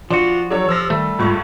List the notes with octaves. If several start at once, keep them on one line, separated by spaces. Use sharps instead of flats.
F3 D4 F4 F#4
F#3 D4 G4 A4 C#5
F3 E6 A#6
D#3 G3 A3
C#2 G2 F4 C#6